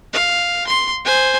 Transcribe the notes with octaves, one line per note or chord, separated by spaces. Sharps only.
F5
C6
C5 G#5